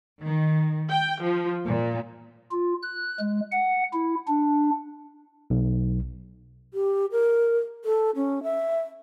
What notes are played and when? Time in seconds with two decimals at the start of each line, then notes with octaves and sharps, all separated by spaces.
0.22 D#3
0.90 G5
1.23 F3
1.65 A#2
2.51 F4
2.82 F#6
3.19 G#3
3.52 F#5
3.93 E4
4.28 D4
5.50 B1
6.74 G4
7.11 A#4
7.85 A4
8.16 C#4
8.43 E5